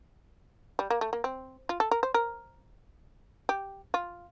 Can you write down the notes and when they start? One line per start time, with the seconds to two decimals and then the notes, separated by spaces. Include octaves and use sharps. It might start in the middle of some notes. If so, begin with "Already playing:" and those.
0.79 G3
0.90 A#3
1.01 A3
1.13 A#3
1.24 C4
1.69 F4
1.80 A4
1.91 A#4
2.03 C5
2.14 A#4
3.49 G4
3.94 F4